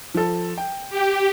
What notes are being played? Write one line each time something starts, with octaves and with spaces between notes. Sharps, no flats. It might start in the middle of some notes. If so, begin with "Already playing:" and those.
F3 A4
G5
G4